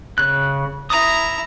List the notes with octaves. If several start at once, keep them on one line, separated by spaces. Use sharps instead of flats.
C#3 F#6
E4 A#5 D#6